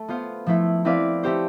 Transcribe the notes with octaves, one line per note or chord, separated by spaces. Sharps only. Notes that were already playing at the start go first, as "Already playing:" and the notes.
Already playing: A3 A4
B3 F4 C5 F5
F3 A3 E4
C4 E4 B4 D5 F5
A3 C4 G4 C5